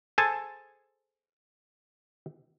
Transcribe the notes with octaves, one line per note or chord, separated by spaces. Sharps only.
G#4 A4 C5 G#5 A5